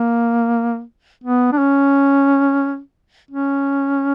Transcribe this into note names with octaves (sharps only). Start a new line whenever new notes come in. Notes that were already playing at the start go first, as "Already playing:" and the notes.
Already playing: A#3
B3
D4
C#4
C#4